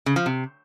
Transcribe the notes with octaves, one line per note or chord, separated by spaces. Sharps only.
C#3
F3
C3